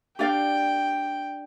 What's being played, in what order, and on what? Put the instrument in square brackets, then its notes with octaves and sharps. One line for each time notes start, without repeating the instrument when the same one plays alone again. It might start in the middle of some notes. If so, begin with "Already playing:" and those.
[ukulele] D4 G4 D5 F5 [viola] G5